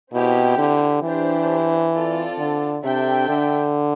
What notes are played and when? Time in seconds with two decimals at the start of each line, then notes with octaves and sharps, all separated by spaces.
0.12 B2 C4 E4 G4
0.58 D3
1.03 E3 D4 G4 C5
1.93 C4 F4 A4 D5 A5
2.39 D3
2.84 C3 D4 A4 E5 G5
3.29 D3